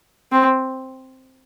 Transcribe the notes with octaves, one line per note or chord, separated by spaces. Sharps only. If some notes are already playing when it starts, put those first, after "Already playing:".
C4